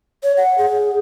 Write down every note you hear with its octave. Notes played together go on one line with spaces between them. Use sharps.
C#5
F#5
G#4